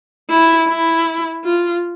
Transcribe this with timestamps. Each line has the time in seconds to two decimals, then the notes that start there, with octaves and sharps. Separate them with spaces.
0.30 E4
0.68 E4
1.44 F4